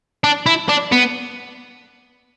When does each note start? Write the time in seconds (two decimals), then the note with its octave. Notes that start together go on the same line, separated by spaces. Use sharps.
0.24 D4
0.46 E4
0.69 D4
0.92 B3